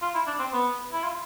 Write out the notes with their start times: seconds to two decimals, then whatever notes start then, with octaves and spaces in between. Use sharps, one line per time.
0.02 F4
0.15 E4
0.27 D4
0.39 C4
0.53 B3
0.92 E4
1.04 F4